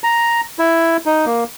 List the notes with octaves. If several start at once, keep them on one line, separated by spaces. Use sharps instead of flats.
A#5
E4
D#4
A#3